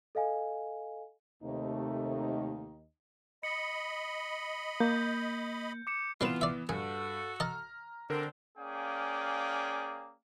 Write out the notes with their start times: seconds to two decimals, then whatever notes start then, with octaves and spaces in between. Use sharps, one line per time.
0.15 A4 D#5 F5 G#5
1.43 D#2 C3 A3 D#4
3.43 D#5 B5 C#7
4.80 A#3 G6
5.87 D6 C#7 E7
6.21 E3 G3 B3 C4 F4 B4 E7
6.41 D5 E5
6.69 G2 F#4 G#4 A4
7.40 D#5 A5 A#5 F6
8.10 B2 D3 C4 D4 A#4
8.58 A#3 C#4 G#4 D5 F5 G5